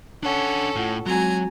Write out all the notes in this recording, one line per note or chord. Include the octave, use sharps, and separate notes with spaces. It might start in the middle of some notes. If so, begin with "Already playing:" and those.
C#4 D4 A4 F#5
A2 F4 F#5
F#3 G#3 C4 F#4 G#5 A#5